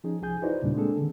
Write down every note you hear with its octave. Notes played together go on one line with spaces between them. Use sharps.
F3 C#4 D#4 G#4
C2 F3 G#4 G#5 G6
D#4 E4 F#4 B4 C5 D5
D#2 A#2 C#3 G3 D4
G#3 A#3 C4 D4 G#4 A4
D3 D#3